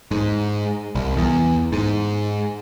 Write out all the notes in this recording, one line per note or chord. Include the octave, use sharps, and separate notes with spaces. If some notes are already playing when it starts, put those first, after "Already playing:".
G#2
C2
E2
G#2